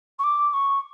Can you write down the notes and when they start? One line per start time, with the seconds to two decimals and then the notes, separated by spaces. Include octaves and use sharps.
0.19 C#6
0.23 D6
0.53 C#6